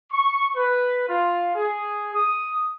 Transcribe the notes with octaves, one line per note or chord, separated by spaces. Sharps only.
C#6
B4
F4
G#4
D#6